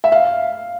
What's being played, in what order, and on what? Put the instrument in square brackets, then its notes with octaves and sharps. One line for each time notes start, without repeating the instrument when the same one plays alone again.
[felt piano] E5
F5